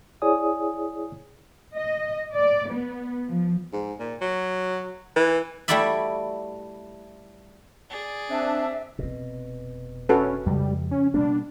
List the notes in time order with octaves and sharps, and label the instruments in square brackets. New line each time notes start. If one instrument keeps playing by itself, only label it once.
[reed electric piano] E4 G#4 C#5 D5 G#5 D#6
[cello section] D#5
D5
B3
F3
[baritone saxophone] G#2
A#2
F#3
E3
[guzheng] G3 A3 E4 F#4 D5 E5
[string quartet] G#4 D5
[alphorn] C4 [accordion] D4 [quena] E5
[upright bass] F1 C4 [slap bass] B2
[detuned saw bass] C#4 [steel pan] F#4 A4 B4
[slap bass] F2 G#3 [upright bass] C#3 F3 [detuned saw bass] G3
[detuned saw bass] C#4
[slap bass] B2 G3 A#3 [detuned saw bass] D4